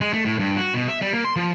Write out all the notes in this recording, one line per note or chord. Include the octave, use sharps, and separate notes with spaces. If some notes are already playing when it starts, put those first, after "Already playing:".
G#3
A3
A2
G2
F#4
B2
E5
G3
A#3
C6
F3